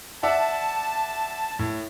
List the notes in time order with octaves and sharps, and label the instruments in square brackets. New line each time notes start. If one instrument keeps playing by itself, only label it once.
[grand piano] D5 E5 F#5 [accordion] A5
[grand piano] A2